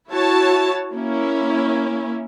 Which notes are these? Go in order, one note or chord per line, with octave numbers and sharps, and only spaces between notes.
E4 F#4 C#5 A5
A#3 C#4 E4